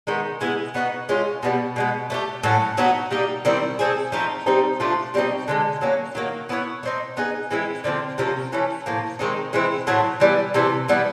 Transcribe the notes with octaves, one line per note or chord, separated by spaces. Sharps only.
D#3 G#3 B3 D#4
G#3 B3 E4 G#4
B3 D#4 F#4 B4
G#3 C#4 F4
B2 G3 B3
B2 G#3 B3
A3 D4 G4
A2 F#3 A3 C#4
F#3 B3 D#4 F#4
G3 A#3 D#4
D#3 G3 C4 E4
A3 C4 F4 G#4
F3 A3 C4 D#4
G3 C4 D#4
F3 A3 D4 F4
B2 G3 C4 D#4
D3 F3 G#3
F#3 A#3 C#4
D#3 F#3 A#3
B3 E4 G#4 C#5
A3 C4 D#4
B3 D#4 G#4
E3 G#3 C4 E4
D3 F3 A3 C4
C3 F3 A#3 C#4
E3 A3 C#4
A2 F3 A#3
D#3 G#3 C4 D#4
E3 G#3 C4 E4
A2 F#3 A3 C4
E3 G3 B3
C3 E3 A3
E3 G3 B3